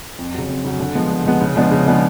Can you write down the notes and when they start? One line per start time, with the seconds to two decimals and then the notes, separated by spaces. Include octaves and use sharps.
0.19 F2
0.34 C#3 F#3
0.49 F2
0.64 C#3 F#3
0.79 D3
0.95 F3 G#3 B3
1.10 D3
1.26 F3 G#3 B3
1.41 C#3
1.56 F3 G#3 B3 D4
1.71 C#3
1.87 F3 G#3 B3 D4